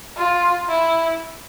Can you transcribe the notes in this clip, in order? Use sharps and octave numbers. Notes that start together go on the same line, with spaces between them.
F4
E4